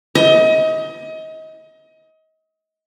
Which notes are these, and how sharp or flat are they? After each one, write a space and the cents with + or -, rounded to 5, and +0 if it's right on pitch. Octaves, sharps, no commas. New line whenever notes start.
D#5 +30